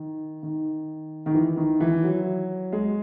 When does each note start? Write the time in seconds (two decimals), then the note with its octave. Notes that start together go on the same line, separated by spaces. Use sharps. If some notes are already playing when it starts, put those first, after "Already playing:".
Already playing: D#3
0.43 D#3
1.26 D#3
1.34 E3
1.57 D#3
1.80 E3
2.04 F#3
2.72 G#3